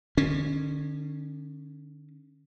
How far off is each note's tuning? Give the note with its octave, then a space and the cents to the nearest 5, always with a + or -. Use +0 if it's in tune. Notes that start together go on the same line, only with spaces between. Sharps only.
D3 +35 C#4 -10